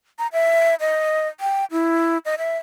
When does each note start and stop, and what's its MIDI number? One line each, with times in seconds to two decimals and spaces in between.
0.19 0.27 82
0.33 0.75 76
0.80 1.28 75
1.40 1.65 79
1.71 2.18 64
2.25 2.35 75
2.38 2.57 76